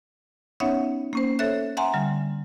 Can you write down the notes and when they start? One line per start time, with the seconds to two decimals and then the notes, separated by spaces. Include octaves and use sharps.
0.60 B3 C#4 D#4 C#5 E5 F#5
1.13 A#3 C#4 C5
1.39 A4 C5 C#5 E5 F#6
1.77 E5 F#5 G#5 A#5 C6
1.94 D3 G3